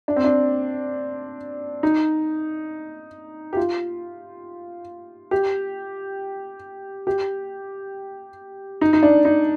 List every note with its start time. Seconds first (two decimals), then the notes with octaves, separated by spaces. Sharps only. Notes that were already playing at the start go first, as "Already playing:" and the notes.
0.08 D4
0.16 C4
0.24 D4
1.83 D#4
3.53 G4
3.57 F4
5.31 G4
7.07 G4
8.81 D#4
8.93 D#4
9.03 D4
9.25 D#4